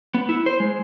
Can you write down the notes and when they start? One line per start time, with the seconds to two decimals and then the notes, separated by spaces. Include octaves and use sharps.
0.14 B3
0.29 E4
0.46 C5
0.60 G#3